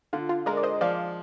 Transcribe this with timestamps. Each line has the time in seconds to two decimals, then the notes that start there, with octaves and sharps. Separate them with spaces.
0.13 D3 F4
0.29 F4
0.46 G#3 A#4 D5
0.57 D5
0.63 C5 D#5
0.81 F3 D5 F5